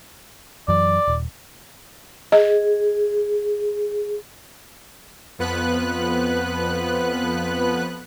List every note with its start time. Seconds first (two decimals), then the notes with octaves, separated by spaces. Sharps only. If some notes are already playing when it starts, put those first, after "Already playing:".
0.68 F#2 E3 F#3 D5
1.08 D#1
2.32 G#4 D#5
5.39 F2 F3 B3 B4 F#6